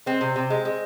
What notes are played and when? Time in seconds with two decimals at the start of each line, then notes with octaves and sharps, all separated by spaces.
0.06 G#3 C4
0.21 C3
0.36 C3
0.50 G#3
0.65 G#3